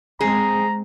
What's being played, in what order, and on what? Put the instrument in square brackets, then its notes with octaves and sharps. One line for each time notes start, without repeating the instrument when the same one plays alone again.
[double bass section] G#3 C4 [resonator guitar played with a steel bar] G#4 [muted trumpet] A#5